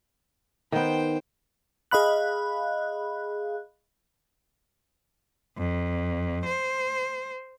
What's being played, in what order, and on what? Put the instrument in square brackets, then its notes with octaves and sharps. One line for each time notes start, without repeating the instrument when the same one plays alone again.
[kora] D#3 B3 [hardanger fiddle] C5 G5
[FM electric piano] G#4 D#5 F5 B5 F#6
[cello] F2
C5